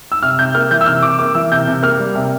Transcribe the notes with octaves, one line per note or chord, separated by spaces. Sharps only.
E6
C3 F6
C3 G6
A#3 F6
E3 G6
E6
C3 F6
C3 D6
A#3 D6
E3 E6
C3 G6
C3
A#3 F6
G3
C3